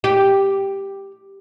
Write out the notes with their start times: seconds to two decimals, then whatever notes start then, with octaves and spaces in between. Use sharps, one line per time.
0.04 G4